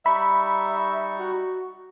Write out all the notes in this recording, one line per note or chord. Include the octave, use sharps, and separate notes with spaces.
G3 D#4 E5 B5 C#6
F#4